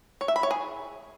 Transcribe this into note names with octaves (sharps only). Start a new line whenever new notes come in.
C#5
E5
B5
C#5
G#4